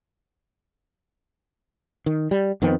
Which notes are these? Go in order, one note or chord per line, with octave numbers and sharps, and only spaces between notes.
D#3
G3
F2 D#3 B3 C4